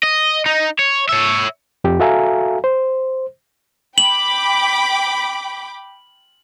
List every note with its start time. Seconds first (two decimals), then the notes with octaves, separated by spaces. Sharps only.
0.03 D#5
0.46 D#4
0.79 C#5
1.09 C#5 E5
1.84 F2 G4
1.99 F#4 A4 E5 F5 G#5 A#5
2.64 C5
3.98 G5 B5 D6 F#7